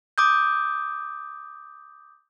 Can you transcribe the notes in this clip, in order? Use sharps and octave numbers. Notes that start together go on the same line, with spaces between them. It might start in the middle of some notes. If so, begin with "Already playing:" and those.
D6 D#6 G6